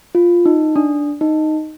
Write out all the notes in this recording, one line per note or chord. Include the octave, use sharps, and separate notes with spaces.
F4
D#4
D4
D#4